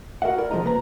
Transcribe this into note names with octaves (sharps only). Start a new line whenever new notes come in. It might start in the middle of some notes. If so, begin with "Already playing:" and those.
F#4 A#4 D#5 E5 F#5
E4 A#4 D5
C2 F3 G#3 A#4 D#5 A#5
C2 A#3 B4 A#5